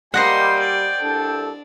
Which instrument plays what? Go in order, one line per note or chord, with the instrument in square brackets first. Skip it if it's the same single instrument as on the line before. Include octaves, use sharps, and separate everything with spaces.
[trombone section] G3 [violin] A#3 C6 [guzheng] C5 D#5 F#5 [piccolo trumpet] G5
[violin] D5
[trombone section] C2 A4 [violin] D4